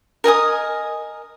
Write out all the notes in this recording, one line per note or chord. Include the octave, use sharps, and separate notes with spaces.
A#4 D#5 G#5 D#6